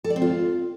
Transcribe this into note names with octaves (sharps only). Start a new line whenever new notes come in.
A4
D5
C4
F4